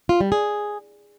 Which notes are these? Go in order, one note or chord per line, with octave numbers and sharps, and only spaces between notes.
F4
G3
G#4